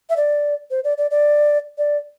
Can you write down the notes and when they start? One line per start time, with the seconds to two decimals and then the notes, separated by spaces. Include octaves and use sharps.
0.10 E5
0.17 D5
0.71 C5
0.84 D5
0.98 D5
1.11 D5
1.78 D5